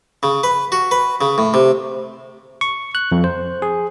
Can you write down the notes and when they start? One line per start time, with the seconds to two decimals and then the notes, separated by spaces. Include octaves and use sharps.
0.23 C#3
0.43 B4
0.72 F#4
0.91 B4
1.21 C#3
1.38 A2
1.54 C3
2.61 C#6
2.95 F#6
3.12 F2
3.24 C5
3.62 G#4